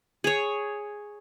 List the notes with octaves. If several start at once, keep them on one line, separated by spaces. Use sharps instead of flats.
G#4 C#5